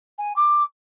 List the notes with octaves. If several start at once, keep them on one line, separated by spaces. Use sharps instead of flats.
G#5
D6